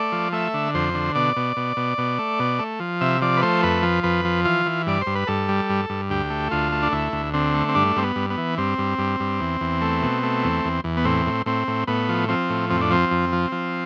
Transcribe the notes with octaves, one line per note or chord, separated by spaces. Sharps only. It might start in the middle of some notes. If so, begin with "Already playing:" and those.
Already playing: A3 D5
F3
A3 E5
D3
F2 C5
D3
B2 D5
B2
B2
B2
B2
A3
B2
A3
F3
C3 E5
F3 D5
B4
A3 C5
F2 B4
F3
F2 B4
F3
E3 F4
E3
G2 D5
C5
G2
B4
G2 A4
G3
G2
G2
D2 G4
A3
D2 F4
A3
D4
D2 E4
D2
D3 C4
A3
C4
G2 D4
G2 C4
B3
G2
B3
E3
G2 C4
G2
G2
G2
E2
E2
A3
B2
A3
E2
E2
E2
B3
A2 C4
A2
A2 C4
A2
A2 B3
F3
F3 C4
A2
F2 C4
D4
F3 C4
F2
F3
F3